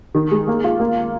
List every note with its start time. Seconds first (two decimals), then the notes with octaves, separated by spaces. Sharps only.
0.15 D#3
0.31 G#3
0.48 A#3
0.64 F4
0.80 A#3